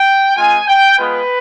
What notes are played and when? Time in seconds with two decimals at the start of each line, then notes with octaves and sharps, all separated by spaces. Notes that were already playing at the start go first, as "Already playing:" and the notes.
Already playing: G5
0.36 G#3 C4 F4 G#5
0.68 G5
0.99 G#3 B3 F4 B4